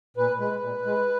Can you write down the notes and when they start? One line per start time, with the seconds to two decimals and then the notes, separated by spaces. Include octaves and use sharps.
0.17 A#2 B4
0.39 G#3 B4
0.61 A#2
0.85 G#3